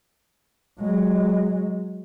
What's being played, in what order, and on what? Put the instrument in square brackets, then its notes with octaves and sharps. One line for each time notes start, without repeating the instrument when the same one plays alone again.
[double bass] F#3 G#3